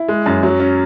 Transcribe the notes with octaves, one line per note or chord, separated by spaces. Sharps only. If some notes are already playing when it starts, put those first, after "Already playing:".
Already playing: E4
G#3
F#2
F#3
C#4